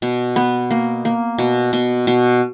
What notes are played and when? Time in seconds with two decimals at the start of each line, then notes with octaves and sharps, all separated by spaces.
0.02 B2
0.36 B3
0.71 A#3
1.05 A#3
1.38 B2
1.73 B2
2.07 B2